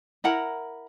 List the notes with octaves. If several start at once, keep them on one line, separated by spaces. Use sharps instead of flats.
E4 A#4 F#5 A#5